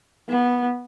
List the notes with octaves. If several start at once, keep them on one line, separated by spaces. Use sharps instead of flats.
B3